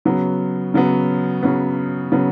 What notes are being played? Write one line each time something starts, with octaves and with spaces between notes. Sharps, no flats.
C#3 F#3 B3
C#3 F#3 B3
C#3 F#3 B3
C#3 F#3 B3